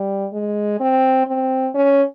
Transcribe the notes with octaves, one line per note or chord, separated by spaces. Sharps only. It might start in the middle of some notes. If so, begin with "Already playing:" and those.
Already playing: G3
G#3
C4
C4
C#4